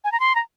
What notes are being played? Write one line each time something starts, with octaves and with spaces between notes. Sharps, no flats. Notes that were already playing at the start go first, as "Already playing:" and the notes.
G#5
A#5
C6
A#5